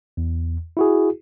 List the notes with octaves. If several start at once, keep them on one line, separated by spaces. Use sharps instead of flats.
E2
E4 F#4 G#4